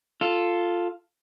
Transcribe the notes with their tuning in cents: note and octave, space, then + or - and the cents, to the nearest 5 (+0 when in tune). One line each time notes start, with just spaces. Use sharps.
F4 +0 A4 +5